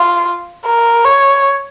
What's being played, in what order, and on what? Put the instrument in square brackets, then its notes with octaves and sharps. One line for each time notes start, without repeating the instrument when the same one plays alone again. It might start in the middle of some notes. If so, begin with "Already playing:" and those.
Already playing: [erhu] F4
A#4
C#5